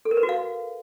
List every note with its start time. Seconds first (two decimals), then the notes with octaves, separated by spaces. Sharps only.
0.05 A4
0.11 A#4
0.17 B4
0.23 F#4
0.29 F5